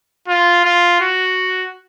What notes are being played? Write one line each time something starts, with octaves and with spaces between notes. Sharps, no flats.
F4
F4
F#4